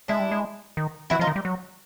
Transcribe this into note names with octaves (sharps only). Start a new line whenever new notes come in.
G#3 D4 E4
G3
G#3
D#3
E3 E4 F#4
F3 D#4 F4
D#3
G3
F#3